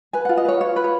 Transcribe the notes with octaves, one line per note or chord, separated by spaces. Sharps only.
B4 G#5
F#5
F4
D#5
B4 C#5
F4 C#5
B4
C#5